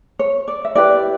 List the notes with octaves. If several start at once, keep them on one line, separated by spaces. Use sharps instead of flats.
C#5
D5
E5
E4 G4 B4 D5